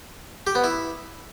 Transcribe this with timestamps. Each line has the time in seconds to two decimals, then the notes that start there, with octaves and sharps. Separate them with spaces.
0.47 G4
0.55 B3
0.64 E4